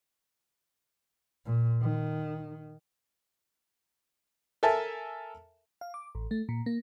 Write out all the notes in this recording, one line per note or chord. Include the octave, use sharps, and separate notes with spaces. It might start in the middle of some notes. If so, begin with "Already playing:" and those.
A#2
D#3
A4 A#4 E5 G#5 A5
F5
D6
A1
A3
A#2
A#3